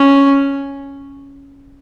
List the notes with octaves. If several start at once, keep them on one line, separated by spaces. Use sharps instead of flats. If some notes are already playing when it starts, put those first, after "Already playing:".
Already playing: C#4